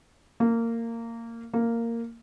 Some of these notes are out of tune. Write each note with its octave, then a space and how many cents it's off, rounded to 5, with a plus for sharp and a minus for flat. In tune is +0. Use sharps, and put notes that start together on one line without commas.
A#3 -20
A#3 -10